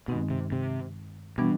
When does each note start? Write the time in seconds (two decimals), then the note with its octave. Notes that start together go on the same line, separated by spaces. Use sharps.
0.08 G2 B2 D#3 G#3 C4 D#4
0.30 C3
0.52 C3
1.38 B2 E3 G3 B3 D4